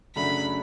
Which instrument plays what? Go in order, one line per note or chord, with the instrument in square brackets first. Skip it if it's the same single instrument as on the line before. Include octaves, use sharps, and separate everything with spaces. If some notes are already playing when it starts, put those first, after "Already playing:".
[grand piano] F#2 C#3 F#3 A3 D4 [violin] B5